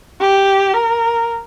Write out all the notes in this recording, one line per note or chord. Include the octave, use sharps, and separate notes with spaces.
G4
A#4